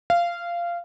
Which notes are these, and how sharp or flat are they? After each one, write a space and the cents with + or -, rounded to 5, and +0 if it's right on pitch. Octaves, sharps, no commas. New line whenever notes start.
F5 -15